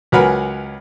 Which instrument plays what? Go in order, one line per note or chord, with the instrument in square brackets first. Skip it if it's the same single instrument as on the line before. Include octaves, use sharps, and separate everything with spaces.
[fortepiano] C#2 F#3 A#4 B4 F#5 G#5